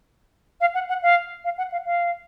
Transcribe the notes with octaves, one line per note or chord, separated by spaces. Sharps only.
F5
F#5
F#5
F5
F5
F#5
F5
F5